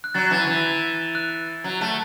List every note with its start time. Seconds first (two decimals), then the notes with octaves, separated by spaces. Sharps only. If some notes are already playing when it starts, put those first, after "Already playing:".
0.04 F#6
0.14 F#3 A6
0.31 E3
0.47 E3
1.15 F#6
1.64 F#3
1.81 A3